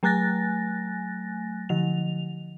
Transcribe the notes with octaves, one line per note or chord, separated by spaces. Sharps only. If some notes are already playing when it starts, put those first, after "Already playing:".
F#3 A3 G#5 F#6 A6 A#6
D3 F3 F7